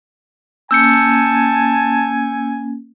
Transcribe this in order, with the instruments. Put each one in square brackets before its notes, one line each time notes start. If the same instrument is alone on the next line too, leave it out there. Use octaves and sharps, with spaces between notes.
[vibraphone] A#3 C#4 [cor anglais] G#5 [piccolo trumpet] A5 [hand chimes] E6 G6 C#7